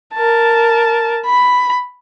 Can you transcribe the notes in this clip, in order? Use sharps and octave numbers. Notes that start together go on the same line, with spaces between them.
A#4 A5
B5